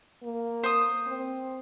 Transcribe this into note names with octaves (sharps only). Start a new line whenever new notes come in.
A#3
C5 D#6
C4